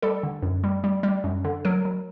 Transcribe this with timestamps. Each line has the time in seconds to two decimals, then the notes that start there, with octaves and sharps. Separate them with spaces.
0.02 G3 A4
0.23 D3
0.43 F#2
0.64 G3
0.84 G3
1.03 G3
1.24 F#2
1.44 D3
1.65 F#3 A#4
1.85 F#3